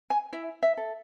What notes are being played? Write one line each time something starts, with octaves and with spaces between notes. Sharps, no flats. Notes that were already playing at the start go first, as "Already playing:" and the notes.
G#5
E4 E5
E5
A4